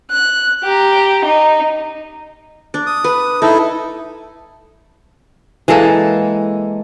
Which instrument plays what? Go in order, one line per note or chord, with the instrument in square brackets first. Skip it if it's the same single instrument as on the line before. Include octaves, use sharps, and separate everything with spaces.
[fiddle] F#6
G4 A#5
D#4
[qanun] D4
[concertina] D#6
[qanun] B4
[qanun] D#4 [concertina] E4 A4
[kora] E3 G#3 A#3 A4